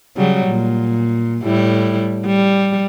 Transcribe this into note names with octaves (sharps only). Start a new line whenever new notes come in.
C#3 F#3 G3
A#2
A2 G3 E4
G3